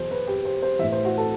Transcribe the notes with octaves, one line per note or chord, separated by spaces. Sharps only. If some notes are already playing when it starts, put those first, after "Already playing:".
Already playing: E2 B2 F#3 C5
B4
G4
C5
C5
A2 E3 E5
C5
F#4
A4